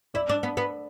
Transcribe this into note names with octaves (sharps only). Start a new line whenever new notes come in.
E4 D5
D4
B3
B3